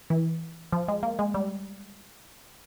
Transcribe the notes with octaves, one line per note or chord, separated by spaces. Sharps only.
E3
F3
G#3
A#3
G#3
G3